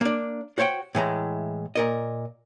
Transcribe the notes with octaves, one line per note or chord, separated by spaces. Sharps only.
A#3 D4
F#4 C5 C#5 F5 G5
A2 E3 G#3 A#5
A#2 A#4 D#5